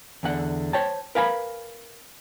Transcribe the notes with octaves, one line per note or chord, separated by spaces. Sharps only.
E2 D3 F#5
C5 C#5 G5 A5
A#4 B4 F5 G#5 A#5 B5